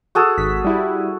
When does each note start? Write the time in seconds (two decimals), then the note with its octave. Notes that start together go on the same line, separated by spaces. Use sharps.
0.15 F#4 G#4 A4
0.38 G#1 B6
0.65 G3 E4